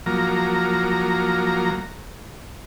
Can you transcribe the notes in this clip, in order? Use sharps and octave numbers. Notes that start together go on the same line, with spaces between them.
F3 F#3 A#3 A#5